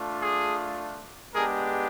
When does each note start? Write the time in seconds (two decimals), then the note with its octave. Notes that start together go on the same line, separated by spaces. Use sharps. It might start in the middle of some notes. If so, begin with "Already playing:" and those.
Already playing: A3 D4 F4
0.22 G#4
1.34 G#3 B3 D4 G4 G#4 A#4